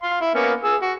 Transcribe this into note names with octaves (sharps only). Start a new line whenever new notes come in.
F5 C6
E4
A#3 B3 C#4
G#4 E6
F#4